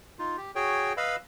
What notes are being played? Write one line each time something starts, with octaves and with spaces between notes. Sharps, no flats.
D#4 F4
G4
F#4 G#4 C#5 G5
B4 D#5 F5 B5 E6